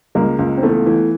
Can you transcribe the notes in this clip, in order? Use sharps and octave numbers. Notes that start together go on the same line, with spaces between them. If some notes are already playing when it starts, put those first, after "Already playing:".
C#2 G#3 A#3
C#2
C4
E3 A3 B3
E3